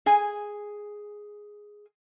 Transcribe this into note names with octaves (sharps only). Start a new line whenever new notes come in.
G#4 G#5